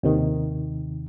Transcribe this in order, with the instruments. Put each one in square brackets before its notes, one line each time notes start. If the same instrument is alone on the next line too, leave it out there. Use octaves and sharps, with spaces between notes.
[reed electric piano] D#2 C3 D#3